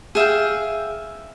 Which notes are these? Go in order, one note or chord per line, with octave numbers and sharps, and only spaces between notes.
G#4 E5 F5 G5